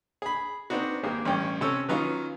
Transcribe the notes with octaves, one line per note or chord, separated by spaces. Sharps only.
G#4 B5
B3 C4 D4 D#4 F#4
G#1 A#3 G4 G#4
A1 G2 C#4 G5
C3 C#4 A4 C#5 E6
D#3 F#3 B3 C#4 D#4 F4